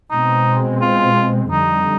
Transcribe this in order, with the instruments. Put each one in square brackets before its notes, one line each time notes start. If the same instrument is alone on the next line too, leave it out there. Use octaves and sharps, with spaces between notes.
[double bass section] B2 G#3 C4 [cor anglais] D#4
[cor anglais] F4
[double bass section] F2 D3 G3 [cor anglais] D#4